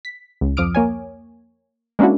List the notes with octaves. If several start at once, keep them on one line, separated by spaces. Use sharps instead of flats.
B6
C#2
F2 F3 D6 D#6 F6 D7
A#3 C#5 G#5
G#3 A#3 C#4 D4 E4 F#4